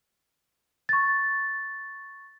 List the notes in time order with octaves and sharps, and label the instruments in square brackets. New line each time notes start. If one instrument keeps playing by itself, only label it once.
[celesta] C#6 A6